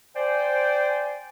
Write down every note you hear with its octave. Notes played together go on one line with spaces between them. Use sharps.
C5 D5 G5 G#5